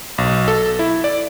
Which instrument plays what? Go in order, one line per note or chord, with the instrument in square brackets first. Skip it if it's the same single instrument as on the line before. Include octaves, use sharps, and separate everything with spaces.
[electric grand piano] B1
A4
E4
D5